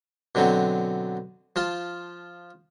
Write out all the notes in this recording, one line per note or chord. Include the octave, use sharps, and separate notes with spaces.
B2 D3 F#3 C4
F3 F4 A5